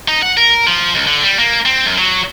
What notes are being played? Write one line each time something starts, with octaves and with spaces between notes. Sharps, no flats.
D#4
F#5
A#4
F3
C#2
D3
G3
A#3
C4
F#2
F#3